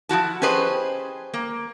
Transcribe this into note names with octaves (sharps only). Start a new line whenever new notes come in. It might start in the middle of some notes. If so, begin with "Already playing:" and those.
F3 E4 F#4 A5
C#4 G4 G#4 B4 C5 D#5
A#3